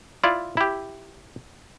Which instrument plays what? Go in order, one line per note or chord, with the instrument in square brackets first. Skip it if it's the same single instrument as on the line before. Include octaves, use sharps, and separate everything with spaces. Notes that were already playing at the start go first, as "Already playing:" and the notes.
[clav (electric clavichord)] E4 F4 D5
E4 G4